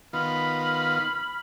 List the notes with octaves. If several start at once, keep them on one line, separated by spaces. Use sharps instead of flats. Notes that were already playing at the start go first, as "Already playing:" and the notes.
D#3 B3 F4 B5 F6